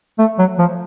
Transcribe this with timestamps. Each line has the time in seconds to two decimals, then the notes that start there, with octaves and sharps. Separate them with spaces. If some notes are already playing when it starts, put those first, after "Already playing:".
0.19 A3
0.39 F#3
0.59 F3